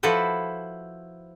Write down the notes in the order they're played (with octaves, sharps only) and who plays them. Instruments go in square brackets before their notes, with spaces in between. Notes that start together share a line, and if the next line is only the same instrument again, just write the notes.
[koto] F3 E4 F#4 A4 B4 C5